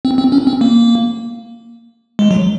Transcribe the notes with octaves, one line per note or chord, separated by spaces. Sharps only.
C4
C4
C#4
C4
A#3
G#3
F#3